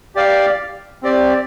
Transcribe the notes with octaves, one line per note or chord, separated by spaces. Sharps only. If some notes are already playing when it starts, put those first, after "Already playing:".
G4 D5 F5
C4 G4 D5